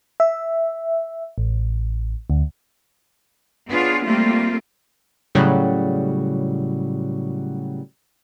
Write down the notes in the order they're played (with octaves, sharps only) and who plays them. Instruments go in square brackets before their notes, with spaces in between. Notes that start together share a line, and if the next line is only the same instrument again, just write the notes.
[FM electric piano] E5
A1
D2
[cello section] B3 D4 F4 G#4 C#5
G3 A3 A#3 C4 F4
[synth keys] A2 C#3 F#3 G3 F#4